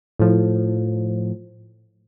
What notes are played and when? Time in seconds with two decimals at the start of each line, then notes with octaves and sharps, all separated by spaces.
0.19 A2 F3